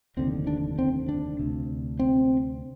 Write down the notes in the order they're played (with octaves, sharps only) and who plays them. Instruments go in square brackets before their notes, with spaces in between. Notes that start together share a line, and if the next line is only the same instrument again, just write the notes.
[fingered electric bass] F1 D#2 D3 C4
D4
C4
D4
D2 C3
C4